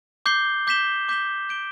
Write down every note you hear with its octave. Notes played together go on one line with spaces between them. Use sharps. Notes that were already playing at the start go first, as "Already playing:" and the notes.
D6 G6 C7 G7
D6 G6 B6 E7 G7
D6 G6 B6 E7 G7
G6 D7 G7